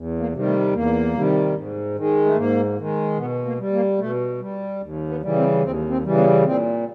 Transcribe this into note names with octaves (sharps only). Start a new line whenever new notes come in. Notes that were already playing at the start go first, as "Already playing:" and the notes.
Already playing: E2
A#3
C3 D#3 G3
A3
E2 A#3
C3 D#3 G3
G#2
D#3 G#3
A3
G#2 A#3
D#3 G#3
B2 B3
A#3
G3
A#3
B2 A3
G3
D#2
B3
C#3 E3 G3
C4
D#2 C4
C4
C#3 E3 G3
B3
A#2 C4